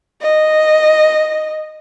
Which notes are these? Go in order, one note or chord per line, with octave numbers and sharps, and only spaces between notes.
D#5